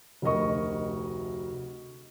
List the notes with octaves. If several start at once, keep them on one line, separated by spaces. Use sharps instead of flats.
F1 D2 A#4 D#5 C#6